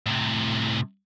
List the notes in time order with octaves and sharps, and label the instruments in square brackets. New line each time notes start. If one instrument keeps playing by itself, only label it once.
[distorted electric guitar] A2 C3